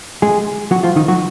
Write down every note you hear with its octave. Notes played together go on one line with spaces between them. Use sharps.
G#3 G#4
F#3 F#4
F3 F4
D#3 D#4
F#3 F#4